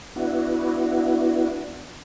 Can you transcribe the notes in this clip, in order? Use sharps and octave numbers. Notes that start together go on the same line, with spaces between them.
B3 D4 E4 F#4